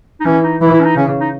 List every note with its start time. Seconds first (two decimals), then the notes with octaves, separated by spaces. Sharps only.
0.20 D#4
0.25 E3 C#4
0.44 D#4
0.61 E3 E4
0.73 E4
0.80 C#4
0.85 D#4
0.96 C#3 C#4
1.20 D#4